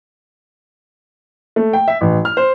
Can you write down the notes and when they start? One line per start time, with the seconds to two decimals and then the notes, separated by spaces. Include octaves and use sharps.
1.56 A3
1.73 G5
1.88 E5
2.01 A1
2.25 F6
2.37 C5